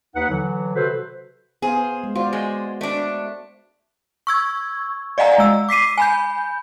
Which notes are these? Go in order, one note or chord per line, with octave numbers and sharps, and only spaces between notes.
D#2 D#4 B4 F#5
D3 E3 F#3
C3 F#4 A4 B4 C5
B3 G#4 C5 F5
G#3
F4 F#4 C5 D5
G#3
A3 D4 D5
C#6 E6 G#6
D5 D#5 F5 F#5 G#5 A#5
G#3 E6
D6 B6 C7 D#7
G#5 B5 G6